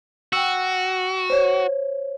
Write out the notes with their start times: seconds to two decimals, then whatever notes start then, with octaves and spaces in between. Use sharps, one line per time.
0.33 F#4 G5 E6
1.30 C5 C#5